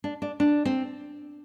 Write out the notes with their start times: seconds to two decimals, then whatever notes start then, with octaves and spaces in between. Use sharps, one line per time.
0.04 D4
0.22 D4
0.40 D4
0.65 C4